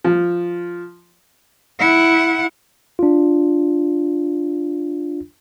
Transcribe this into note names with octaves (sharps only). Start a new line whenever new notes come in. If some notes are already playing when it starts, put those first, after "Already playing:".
F3
E4 F#5
D4 F4